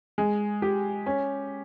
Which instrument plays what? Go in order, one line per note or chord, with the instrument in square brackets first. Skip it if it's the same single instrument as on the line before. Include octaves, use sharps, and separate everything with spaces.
[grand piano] G#3
G4
C#4